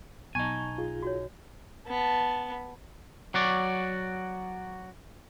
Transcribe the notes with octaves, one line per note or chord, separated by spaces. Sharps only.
B1 D#4 G#5 A5 C#6
F4 G#4
F#4 C#5
B3 A5
F#3 F#4 D5